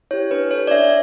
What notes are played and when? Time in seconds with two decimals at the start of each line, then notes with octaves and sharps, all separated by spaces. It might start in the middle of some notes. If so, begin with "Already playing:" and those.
0.11 E4 G4 C#5
0.31 D4 B4
0.51 A4 C#5
0.67 D5
0.71 D4 E5